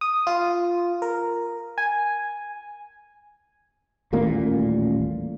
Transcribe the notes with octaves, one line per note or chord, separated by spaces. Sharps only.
D#6
F4
A#4
G#5
D#1 A1 A#2 A#3